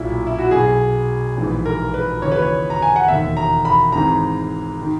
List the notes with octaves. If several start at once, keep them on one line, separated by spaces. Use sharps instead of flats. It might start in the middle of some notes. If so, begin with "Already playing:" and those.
Already playing: B1 A#2 E4
E4
F#4
B1 B2 G#4
A#1 G#2 E3
A#4
B4
D#2 C#3 E3 C#5
B4
C#5
A#5
G#5
F#5
E1 D#2 D#3 E5
A#5
B5
G#1 G#2 E3 A#5
D#3